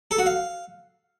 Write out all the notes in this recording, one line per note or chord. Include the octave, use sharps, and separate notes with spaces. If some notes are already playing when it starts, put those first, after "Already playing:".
A4
F#4
F5